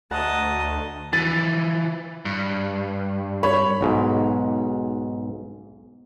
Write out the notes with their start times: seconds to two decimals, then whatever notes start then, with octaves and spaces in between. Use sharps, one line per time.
0.11 D2 D#5 F#5 A5 A#5
1.13 E3 F3 A6
2.25 G2
3.43 C#5 B5
3.81 B1 G#2